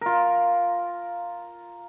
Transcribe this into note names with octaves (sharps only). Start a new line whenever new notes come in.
F4 A#4